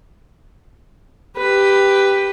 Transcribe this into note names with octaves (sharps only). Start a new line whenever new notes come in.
G4 B4